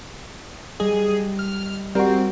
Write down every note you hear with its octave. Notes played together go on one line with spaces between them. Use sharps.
G3 G#4 D#5
F6
G3 C4 F#4 A#4